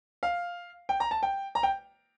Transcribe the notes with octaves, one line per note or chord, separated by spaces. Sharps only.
F5
G5
A#5
A5
G5
A#5
G5